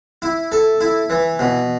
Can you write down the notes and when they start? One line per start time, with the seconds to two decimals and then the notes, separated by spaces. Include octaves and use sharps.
0.22 E4
0.52 A4
0.81 E4
1.10 E3
1.39 B2